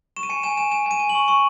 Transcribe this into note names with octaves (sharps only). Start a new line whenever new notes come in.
C#6 E7
D#7
G#5 C#7
G#5 E7
G#5 E7
G#5 E7
G#5
D#7
G#5
F#7
C#6
C#6